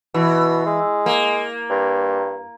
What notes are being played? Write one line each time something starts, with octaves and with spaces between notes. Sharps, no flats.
B2 E3
G#3
A#3
G2